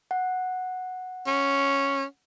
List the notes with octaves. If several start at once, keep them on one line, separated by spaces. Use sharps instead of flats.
F#5
C#4